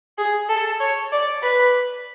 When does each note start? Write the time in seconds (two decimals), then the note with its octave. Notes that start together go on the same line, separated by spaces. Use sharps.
0.18 G#4
0.49 A4
0.80 C#5
1.12 D5
1.43 B4